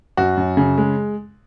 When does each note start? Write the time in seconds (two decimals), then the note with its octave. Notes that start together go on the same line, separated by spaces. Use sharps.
0.17 F#2 F#4
0.37 F#2
0.57 C#3
0.78 G#3